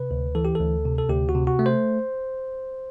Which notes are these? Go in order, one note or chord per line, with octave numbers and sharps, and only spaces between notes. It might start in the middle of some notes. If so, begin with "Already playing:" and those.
Already playing: C3 B4
D2
E3 A4
G4
D2 A4
C3
A4
D2 G4
F#4
C3
F#4
A3
C5